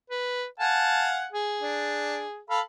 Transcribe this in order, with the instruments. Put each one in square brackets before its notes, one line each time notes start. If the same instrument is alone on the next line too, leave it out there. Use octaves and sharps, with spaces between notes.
[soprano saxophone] B4
[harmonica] F5 F#5 G#5 [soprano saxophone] A5
[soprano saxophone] G#4
[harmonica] D4
A4 F5 B5